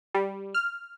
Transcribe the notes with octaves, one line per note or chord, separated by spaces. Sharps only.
G3
F6